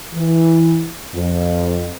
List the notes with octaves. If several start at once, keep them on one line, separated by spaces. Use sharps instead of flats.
E3
F2